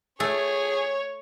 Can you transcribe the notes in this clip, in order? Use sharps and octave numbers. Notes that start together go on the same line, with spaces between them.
A3 G#4 C#5